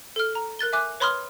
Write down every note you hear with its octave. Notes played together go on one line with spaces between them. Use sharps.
A4 F6
A#5
A#4 F#6 A6 G7
E5 G#5 D6 F#6
B4 C#5 B5 C6 D#6 F6